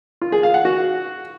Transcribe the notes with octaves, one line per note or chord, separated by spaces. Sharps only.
F4
G#4
F5
F#5
F#4